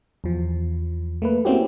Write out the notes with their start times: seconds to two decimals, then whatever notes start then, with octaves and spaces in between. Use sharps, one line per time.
0.24 E2 F3
1.22 A3 A#3 B4
1.45 A#3 C4 C#4 E4 F#4 G4